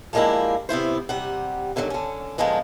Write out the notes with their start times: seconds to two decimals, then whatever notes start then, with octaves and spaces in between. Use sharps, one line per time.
0.13 F3 G3 G#3 A#3 D4 E4
0.69 C3 B3 E4 C5
1.09 C3 G3 F#5
1.76 G#2 D3 D#3 F3 F#3
1.90 D3 C#4
2.38 A#2 D3 F3 G#3 B3